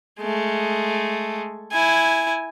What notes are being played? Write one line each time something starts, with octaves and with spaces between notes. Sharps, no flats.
G#3 A3
E4 G#5